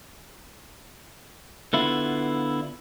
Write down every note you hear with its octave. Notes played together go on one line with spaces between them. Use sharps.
D3 B3 E4 F4